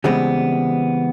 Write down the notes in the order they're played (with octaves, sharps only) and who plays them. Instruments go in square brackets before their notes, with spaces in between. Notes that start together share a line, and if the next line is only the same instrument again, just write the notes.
[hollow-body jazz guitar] C#3 E3 G3 G#3 B3 C4